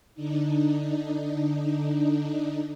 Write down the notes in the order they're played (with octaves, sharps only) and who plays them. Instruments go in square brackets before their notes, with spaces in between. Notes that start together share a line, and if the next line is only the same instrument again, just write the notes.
[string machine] D3 D4 D#4